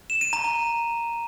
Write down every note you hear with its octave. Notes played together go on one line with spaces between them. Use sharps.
E7
D#7
A#5
A#5